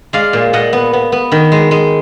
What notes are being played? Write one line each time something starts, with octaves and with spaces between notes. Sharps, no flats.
G#3 D5 F5
A#2
A#2 D#5 F#5
B3
B3
B3
D#3
G#3
G#3